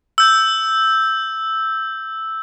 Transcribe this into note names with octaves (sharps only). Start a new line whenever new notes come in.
E6 G6